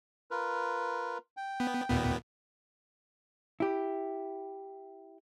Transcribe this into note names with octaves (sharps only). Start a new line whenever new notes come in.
F4 A#4 B4
G5
B3
D#2 A#2 B3
E4 G4